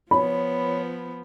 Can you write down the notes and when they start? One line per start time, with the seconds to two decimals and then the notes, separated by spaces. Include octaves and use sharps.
0.11 F3 B3 C#5 B5